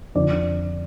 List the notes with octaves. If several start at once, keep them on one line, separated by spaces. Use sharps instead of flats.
F2 D3 F3 D5